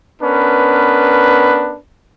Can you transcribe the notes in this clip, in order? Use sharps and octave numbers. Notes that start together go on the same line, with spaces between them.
B3 C#4 D4 A#4 B4